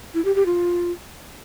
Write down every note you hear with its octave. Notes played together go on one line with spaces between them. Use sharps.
E4
G4
G4
F4